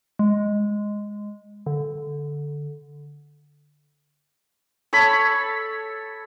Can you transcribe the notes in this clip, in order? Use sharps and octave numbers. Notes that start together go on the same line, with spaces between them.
G#3
D3
A4 C#5 A5 B5